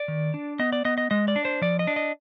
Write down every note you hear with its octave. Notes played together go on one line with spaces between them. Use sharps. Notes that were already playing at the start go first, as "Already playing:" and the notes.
Already playing: D5
D#3
D4
B3 D#5
D5
B3 D#5
D#5
G#3 D#5
D5
D4
C5
F3 D5
D#5
D4
D#5